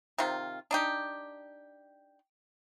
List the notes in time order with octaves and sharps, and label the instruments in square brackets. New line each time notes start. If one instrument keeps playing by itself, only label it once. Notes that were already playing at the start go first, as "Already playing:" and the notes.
[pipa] C3 D#3 F4
D4 D#4 G4